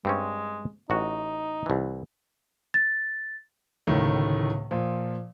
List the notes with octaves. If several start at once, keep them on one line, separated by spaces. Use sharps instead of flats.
G2 G#3 C4 C#4
A1 D#4 F#4
C2 E3
A6
D1 C#2 A2 D#3 A3
A#2 F3